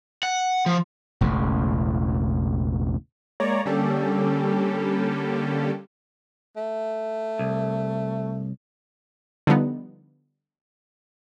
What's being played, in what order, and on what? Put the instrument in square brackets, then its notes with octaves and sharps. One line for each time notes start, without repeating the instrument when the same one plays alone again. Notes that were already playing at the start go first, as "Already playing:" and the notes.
[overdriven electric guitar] F#5
F3
[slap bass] E1 A1 E2 C#3
[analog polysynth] G#3 A#3 C#5 D5 A#5
D3 G3 A#3 C#4 G4 A4
[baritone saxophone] A3
[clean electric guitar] C2
[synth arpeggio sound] D3 F3 G3 B3 D#4